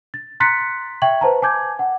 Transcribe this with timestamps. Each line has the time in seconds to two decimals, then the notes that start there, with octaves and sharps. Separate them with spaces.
0.14 A6
0.40 A#5 C6 F#6 A6 B6 C#7
1.02 E5 G5 C#6 G#6 F#7
1.21 B4 C5 A5 A#5
1.42 G#5 A5 D6 G6 G#6
1.79 F#5